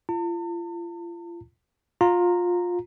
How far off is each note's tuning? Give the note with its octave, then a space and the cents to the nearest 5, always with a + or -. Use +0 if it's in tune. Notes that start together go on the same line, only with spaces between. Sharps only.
F4 -35 A5 +45
F4 +20 A#5 -10